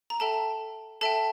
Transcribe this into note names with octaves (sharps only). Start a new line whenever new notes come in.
A#5
A4 E5 G5 A5
A4 E5 G5 A5